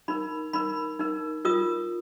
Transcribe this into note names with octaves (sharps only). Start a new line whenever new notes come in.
D#4 A#4 B5
D#4 A#4 B5
D#4 A#4
F4 A#4 D#6